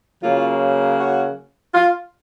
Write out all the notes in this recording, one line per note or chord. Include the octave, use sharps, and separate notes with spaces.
C#3 F#3 A#3 F4
F#4
F4